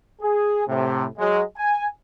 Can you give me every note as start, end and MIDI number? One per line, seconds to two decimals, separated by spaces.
0.22 0.63 68
0.67 1.05 45
0.67 1.05 48
1.19 1.42 54
1.19 1.42 56
1.57 1.87 80